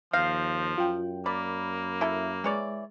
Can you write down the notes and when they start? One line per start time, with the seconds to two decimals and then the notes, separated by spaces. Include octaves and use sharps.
0.13 D#2 F3 F5 G6 A#6
0.78 F#2 F4 G5
1.26 A#3 D5 B5
2.01 E4 A4
2.44 E3 G#3 C#5 D5